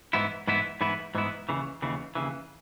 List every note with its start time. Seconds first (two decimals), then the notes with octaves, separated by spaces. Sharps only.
0.13 G#2 E3 B3 E4
0.47 G#2 E3 B3 E4
0.81 G#2 E3 B3 E4
1.15 G#2 E3 B3 E4
1.49 D#2 C#3 E3
1.82 D#2 C#3 E3
2.15 D#2 C#3 E3